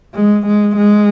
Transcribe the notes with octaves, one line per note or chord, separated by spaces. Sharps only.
G#3
G#3
G#3